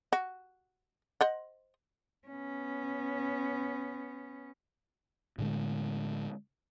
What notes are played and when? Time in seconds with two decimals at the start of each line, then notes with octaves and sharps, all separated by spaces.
0.13 F#4
1.21 C5 D#5 F#5
2.28 B3 C#4
5.38 A2 D3 G#3